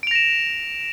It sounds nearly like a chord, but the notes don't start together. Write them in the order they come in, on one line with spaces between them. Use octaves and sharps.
D7 F7 A#6 E7